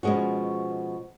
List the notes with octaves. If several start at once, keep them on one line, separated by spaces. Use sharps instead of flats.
B2 F3 G#3 C#4 F#4